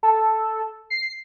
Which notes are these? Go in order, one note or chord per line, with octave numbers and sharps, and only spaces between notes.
A4
C7